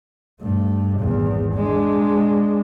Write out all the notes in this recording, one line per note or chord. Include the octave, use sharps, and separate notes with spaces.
G2 A3
G#1 E2
G#3 D4